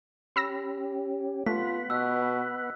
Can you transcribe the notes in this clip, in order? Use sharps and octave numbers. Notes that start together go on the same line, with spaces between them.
C#4 G4 B5 E6 A#6
A3 B3 F4 F#5 B5 B6
B2 E6 F#6